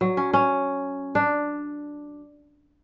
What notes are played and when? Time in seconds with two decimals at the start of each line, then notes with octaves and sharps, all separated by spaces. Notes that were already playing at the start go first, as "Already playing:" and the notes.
0.01 F#3
0.17 C#4
0.33 C#4
1.15 D4